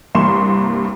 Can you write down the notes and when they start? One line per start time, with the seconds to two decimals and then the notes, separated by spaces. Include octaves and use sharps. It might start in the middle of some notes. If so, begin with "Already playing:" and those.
0.15 C2 G2 A#3 C6 C#6 E7